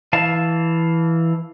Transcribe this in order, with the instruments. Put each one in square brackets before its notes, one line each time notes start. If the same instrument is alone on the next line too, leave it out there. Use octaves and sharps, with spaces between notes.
[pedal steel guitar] E3 F5 A5